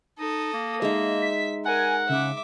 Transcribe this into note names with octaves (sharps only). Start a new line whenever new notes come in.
D#4 A4 D#6
A#3
G#3 D#4 E5
B6
A#4 F#5 G#5
C#3 E5 D6